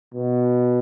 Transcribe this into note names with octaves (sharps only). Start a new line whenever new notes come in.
B2